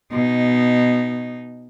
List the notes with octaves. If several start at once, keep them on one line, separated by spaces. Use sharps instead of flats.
B2 D#4